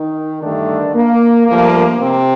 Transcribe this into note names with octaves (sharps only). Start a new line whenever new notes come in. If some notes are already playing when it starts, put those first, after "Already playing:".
Already playing: D#3 D#4
G2 D3 D#3 A3 D4
A#3
G2 F3 A3 A#3
C3 C4